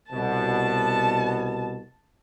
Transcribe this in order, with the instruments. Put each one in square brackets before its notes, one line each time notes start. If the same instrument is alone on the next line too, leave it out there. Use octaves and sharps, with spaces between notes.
[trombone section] C2 B2 [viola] A5